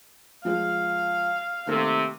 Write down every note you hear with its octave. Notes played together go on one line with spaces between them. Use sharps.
F3 G#3 F5
C3 D#3 A3 A#3